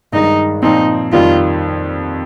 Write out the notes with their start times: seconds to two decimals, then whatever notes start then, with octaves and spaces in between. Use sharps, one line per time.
0.13 G2 D#3 G#3 D#4
0.63 A#2 F3 C4 D#4
1.12 F2 D#3 G3 F4